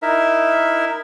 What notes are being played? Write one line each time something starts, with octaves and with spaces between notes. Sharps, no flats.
D#4 E4 A#4 E5